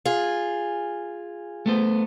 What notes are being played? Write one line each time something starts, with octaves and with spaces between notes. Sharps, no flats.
F4 G#4
A3 B3 C5